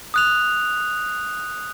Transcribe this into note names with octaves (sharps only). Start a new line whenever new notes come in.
D#6 F#6 F7